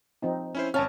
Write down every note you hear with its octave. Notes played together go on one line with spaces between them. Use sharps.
F3 C4 D#4
C#4 E4 C5
G#1 C#4 A5 F6